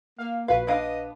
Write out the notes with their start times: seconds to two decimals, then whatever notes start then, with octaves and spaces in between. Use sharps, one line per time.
0.18 A#3 F5
0.48 A#1 F#4 B4 F5
0.67 B3 D4 D#5 F5